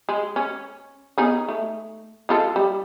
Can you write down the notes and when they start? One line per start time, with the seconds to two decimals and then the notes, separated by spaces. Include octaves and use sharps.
0.09 G#3
0.36 C#4
1.18 B3 D#4 G#4
1.49 A3
2.29 G#3 F4 A4
2.56 G3